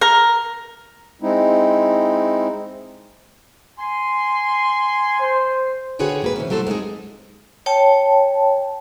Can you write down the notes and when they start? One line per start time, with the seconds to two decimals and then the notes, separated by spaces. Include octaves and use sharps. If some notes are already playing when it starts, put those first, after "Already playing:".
0.01 A#4
1.22 G#3 C4 D#4 E4
3.78 G#5 C6
5.21 C5
5.99 D3 F#4 G#4 B4 C#5 G5
6.22 G#2 A#3 B4
6.36 C3 E3 C#4
6.50 F#3 A3 G4 A4 C5
6.67 G#3 B3 C4 D#4 G#4
7.66 C#5 G5 A5